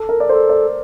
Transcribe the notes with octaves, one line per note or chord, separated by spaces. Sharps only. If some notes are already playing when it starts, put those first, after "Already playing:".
Already playing: A4
A#4
D5
A4 C5
D5